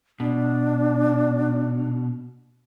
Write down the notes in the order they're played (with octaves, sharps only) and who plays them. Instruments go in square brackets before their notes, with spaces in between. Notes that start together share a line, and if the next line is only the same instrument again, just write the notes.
[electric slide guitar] B2 [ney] D4